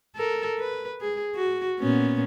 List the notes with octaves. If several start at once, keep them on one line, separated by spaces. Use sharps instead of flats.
A4 A#4
B4
G#4
F#4
A#2 B3 C#4